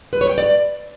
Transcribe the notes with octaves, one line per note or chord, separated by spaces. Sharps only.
B4
C#5
G5
D5